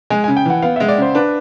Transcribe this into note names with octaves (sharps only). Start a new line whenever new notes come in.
G#3 G#5
C#3 G#5
G5
E3 F#5
B3 F5
G#3 E5
D5
C#3 C5
D4 B4